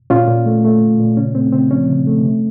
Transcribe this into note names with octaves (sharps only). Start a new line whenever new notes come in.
A#2 C#4 F4
A#2
A3
A3
A#2
A#2
C#3 C#4
A3 C4
C#3 C4
F3 C#4
C#3
A3
C3